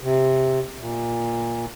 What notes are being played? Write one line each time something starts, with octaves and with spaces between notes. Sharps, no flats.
C3
A#2